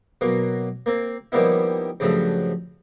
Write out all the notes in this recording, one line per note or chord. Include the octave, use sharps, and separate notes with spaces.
B2 F#3 A#3
A#3 C4
D#3 F3 G3 A#3 B3 E4
G2 C#3 F3 F#3 A3